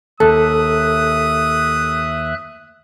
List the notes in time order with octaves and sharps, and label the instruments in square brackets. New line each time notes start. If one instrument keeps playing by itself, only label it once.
[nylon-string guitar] D#2 [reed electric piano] A4 [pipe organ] E5 F#6 [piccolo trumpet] D#6